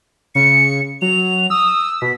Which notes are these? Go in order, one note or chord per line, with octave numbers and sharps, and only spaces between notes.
C#3 C#7
F#3 F7
D#6 E6
B2 B6